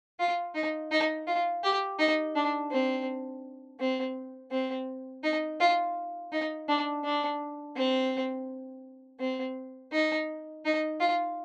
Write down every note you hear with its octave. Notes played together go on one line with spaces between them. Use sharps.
F4
D#4
D#4
F4
G4
D#4
D4
C4
C4
C4
D#4
F4
D#4
D4
D4
C4
C4
D#4
D#4
F4